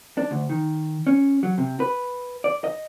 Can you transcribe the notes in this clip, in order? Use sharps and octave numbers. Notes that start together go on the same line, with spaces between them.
D4
D2
D#3
C#4
F#3
C3
B4
D5
D#5